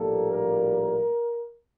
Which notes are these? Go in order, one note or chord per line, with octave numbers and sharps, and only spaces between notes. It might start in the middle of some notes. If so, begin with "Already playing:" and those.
Already playing: A#1 A2 G3 A#3 A4
A#4